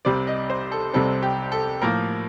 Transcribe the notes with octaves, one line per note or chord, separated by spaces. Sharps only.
C2 C3 G3 C4 D5
D#5
C5
A4
C2 C3 G3 C4 A4
G4
A4
A2 F3 A#3 A#4